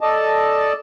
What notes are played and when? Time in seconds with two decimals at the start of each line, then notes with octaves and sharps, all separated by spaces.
0.01 A4 D5 D#5 A5